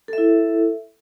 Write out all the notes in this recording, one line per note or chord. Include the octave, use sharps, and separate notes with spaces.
E4 A4 E5